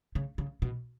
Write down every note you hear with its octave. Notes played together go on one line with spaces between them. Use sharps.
C#3
C#3
B2